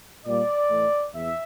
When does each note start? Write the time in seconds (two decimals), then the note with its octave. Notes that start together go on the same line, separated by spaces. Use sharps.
0.25 A#2 G3 A#3 D5
0.70 A2 E3 A3
1.14 E2 E5